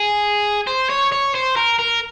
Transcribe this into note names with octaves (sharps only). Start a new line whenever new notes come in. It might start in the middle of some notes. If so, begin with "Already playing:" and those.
Already playing: G#4
C5
C#5
C#5
C5
A#4
A#4